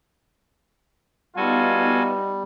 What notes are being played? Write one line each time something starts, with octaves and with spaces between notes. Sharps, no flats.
G3 B3 D#4 F4 F#4 A4 G#5